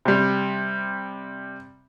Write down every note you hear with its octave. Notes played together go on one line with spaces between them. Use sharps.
C3 G3